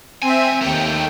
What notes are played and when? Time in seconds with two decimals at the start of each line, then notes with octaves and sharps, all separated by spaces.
0.22 F2 C4 E5 G#5
0.61 D#2 A3 A#4 G5